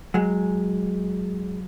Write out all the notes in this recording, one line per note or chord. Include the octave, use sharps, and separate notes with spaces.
F#3 G#3